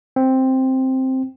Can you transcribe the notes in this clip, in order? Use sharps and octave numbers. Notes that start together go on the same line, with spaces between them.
C4